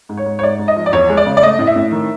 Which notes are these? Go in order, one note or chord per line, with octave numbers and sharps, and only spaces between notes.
G#2
C#5
G#2
C#5
G#2 D5
G#2
D#5
F3
D5
E2 C#5
G#3
D5
C#3
D5
A3 D#5
A2
E5
A2
D#3